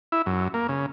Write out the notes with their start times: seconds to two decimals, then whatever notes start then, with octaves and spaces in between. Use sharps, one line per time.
0.12 E4
0.26 F#2
0.54 A#3
0.68 C#3